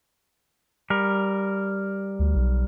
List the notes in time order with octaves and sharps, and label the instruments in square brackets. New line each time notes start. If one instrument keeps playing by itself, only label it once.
[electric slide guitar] G3 A#4
[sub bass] D2
B1